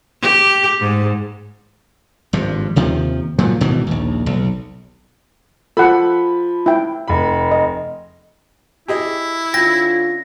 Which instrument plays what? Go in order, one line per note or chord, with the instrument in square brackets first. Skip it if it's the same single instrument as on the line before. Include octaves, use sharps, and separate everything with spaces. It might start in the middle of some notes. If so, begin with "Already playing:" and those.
[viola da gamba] G4
G#2
[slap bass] G#1 G2 F3
D#2 C3 D#3 F3
A#2 D#3 F3 F#3
G#1 B2 D#3 E3
A#1 D#2
B1
[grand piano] F3 B5 [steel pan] A4 F#5
[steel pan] E4 G5
[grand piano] F1 B5
[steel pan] D#5
[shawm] E4 [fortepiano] G4 G#4 D#5
[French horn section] D3 C#4 F4 [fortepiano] G5 [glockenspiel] A#6